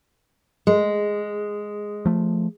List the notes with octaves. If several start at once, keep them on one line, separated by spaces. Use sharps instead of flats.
G#3
F3 A3